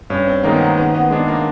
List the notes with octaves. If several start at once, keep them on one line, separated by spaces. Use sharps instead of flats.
G2 C#4
C4
D#3 G#3 A#3 B3
A#3
B3
D#3 B3
B3
G#3 B3 D4
A#3